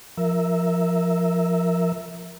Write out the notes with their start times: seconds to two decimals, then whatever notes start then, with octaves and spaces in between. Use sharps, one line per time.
0.17 F3 A#4 E5